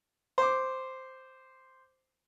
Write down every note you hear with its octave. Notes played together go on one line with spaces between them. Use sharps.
C5 D6